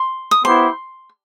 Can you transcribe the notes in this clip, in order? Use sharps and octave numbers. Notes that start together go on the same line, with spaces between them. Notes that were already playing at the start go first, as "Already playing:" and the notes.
Already playing: C6
D#6
B3 E4 G4 C5 C6